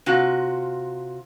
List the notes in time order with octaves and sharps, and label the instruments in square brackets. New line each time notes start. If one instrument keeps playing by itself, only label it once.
[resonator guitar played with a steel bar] C3 F4 F#4